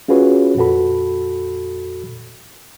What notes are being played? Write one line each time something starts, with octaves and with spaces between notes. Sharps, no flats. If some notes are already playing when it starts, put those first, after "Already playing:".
C#4 F4 F#4 G#4 B4 C#5
F2 A#2 F#4 A4 B5